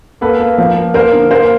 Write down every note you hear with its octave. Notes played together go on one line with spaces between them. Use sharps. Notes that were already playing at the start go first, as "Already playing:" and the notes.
A#3 A4 B4
A#3
F3
A#3
A#3 A#4 C5
D3
A#3 A#4 C5